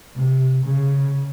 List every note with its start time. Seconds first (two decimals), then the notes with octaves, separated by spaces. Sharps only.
0.16 C3
0.64 C#3